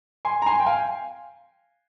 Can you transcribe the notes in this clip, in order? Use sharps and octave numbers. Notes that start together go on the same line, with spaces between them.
G#5 C6
A#5
G#5 C6
G5
F5 G#5